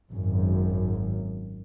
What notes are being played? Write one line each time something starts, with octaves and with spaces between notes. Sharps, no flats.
G#1 F#2